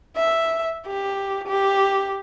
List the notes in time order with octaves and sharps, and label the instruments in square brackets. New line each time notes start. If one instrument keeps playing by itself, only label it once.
[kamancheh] E5
G4
G4